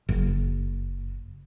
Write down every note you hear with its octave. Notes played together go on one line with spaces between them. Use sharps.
F#1